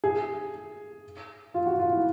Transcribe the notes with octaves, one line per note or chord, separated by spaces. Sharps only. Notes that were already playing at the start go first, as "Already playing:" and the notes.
G#4
F4
F#4
F4
E4